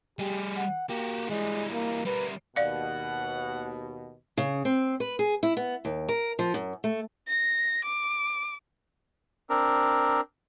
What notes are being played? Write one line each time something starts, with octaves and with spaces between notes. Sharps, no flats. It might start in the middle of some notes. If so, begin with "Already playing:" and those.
G3 G4 G#4
F#5
A#3 F#4 G4
E3 G3 G#3
A#3
G3 A#4 B4
D#2 B2 D5 F5 F#5
C#3
C4
B4
G#4
E4
B3
D#2
A#4
F3
F#2
A3
A#6
D6
C4 D4 A#4